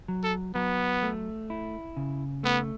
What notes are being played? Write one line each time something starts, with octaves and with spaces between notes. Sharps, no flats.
F#3
A4
F#3 B3
A3
E4
C#3
A3 B3